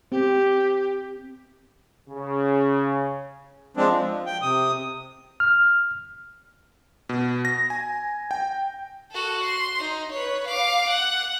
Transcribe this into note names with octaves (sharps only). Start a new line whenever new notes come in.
C4 G4
C#3
F3 G#3 C4 D4
F3
G5
C3 D#6
F6
B2
A#6
G#5
G5
F#4 A4
C6
D#4
B4 C#5
F5 D6
F#5